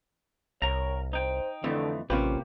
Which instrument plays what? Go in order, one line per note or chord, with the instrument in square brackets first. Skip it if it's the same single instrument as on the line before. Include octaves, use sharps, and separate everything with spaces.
[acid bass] C2 [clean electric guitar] A#4 A#5 [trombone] C#5
[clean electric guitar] D#4 G5 [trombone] C5
[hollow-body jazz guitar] F2 E3 [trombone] D3 [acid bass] A3
[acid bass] A1 [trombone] C3 [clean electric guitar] A#3 G4 [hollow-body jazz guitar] C#4 F4 B4